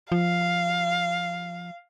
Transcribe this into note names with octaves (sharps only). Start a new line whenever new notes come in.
F3 F5